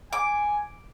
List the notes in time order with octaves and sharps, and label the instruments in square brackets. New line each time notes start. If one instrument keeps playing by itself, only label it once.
[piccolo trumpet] G#5 [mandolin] D6